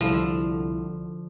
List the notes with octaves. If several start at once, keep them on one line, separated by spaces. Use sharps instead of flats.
C2 D3 F3 E4